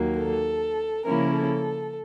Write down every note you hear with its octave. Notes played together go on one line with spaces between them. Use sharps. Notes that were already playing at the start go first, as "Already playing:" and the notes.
Already playing: D#2 D#3 F#3 A#3
A4
C#3 F3 A#3 C#4 E4 A#4
A4